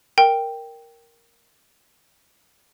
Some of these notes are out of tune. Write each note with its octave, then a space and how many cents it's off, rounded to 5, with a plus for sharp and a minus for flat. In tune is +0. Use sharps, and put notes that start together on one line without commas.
A#4 +0 G5 +0